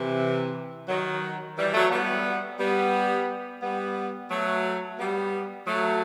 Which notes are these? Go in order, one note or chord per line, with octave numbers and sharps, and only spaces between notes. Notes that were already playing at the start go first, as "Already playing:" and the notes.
Already playing: C3 E3
D#3 F#3
E3 G3
F#3 A3
G3 B3
G3 B3
G3 B3
F#3 A3
G3 B3
F#3 A3